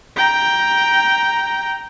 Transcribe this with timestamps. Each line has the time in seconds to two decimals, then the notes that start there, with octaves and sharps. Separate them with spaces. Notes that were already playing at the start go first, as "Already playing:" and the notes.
0.16 G5 A#5